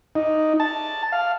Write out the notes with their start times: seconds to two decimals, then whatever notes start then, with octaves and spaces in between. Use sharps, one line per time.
0.15 D#4
0.60 A5
1.12 F5